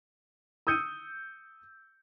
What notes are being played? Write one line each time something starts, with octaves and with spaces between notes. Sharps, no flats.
D#6 E6 G6 C#7 D#7